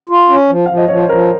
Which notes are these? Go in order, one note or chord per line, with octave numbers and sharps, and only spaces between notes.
F4
C#4
F3
F3 F5
D#5
F3 C#5
C5
F3 A#4